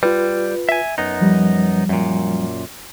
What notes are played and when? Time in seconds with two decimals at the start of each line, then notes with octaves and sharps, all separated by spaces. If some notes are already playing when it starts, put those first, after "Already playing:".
0.03 G3 F4 B4
0.69 E5 G#5
0.98 F#2 B3 D#4
1.21 F3 G3
1.89 F#2 A#2